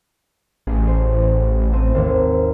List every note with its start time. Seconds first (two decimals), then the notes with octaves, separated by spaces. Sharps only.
0.67 A1 G#4
0.88 C5
1.73 A3 C4 D#7
1.95 G#1 D#2